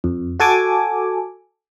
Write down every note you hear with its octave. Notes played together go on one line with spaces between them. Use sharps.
F2
F#4 A4 G#5 D6